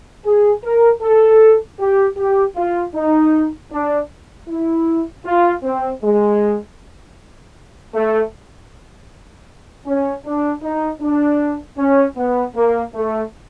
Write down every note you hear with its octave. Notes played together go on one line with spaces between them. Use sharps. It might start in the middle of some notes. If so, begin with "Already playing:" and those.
G#4
A#4
A4
G4
G4
F4
D#4
D4
E4
F4
C4
G#3
A3
C#4
D4
D#4
D4
C#4
B3
A#3
A3